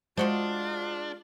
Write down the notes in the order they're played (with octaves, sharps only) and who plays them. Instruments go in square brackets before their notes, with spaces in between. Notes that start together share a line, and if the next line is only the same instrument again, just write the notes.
[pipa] F3 F#4 C5 [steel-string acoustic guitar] G#3 [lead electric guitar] D4 [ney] F4